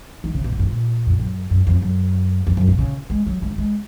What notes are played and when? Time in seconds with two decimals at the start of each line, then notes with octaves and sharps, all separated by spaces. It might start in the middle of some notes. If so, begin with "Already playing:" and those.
0.24 D#3
0.34 C#3
0.44 B2
0.52 A#2
0.59 G#2
0.67 A#2
1.06 F2
1.20 F#2
1.50 F#2
1.67 F2
1.82 F#2
2.47 F2
2.57 F#2
2.68 B2
2.79 C#3
3.10 G#3
3.26 F#3
3.42 G#3
3.51 A#3
3.58 G#3